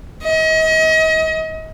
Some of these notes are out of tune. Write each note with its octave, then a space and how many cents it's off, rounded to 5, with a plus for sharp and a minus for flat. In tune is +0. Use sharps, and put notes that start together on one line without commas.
D#5 +35